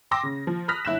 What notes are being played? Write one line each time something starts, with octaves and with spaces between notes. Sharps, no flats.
G5 C6 D6 E6 A#6
C#3
F3
B5 D#6 F6 F#6 A#6 B6
G1 E4 F#6 B6 E7